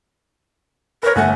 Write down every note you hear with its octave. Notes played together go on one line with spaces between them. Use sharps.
A#4 B4 C#5
G1 A3 F#5 G#5